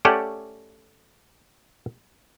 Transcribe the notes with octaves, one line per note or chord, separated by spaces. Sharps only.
A3 C#4 G4 A4 D5 F#5